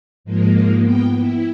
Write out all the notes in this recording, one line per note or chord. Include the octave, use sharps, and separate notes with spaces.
G#2 F3 G#3 A#3
B3 G5
E4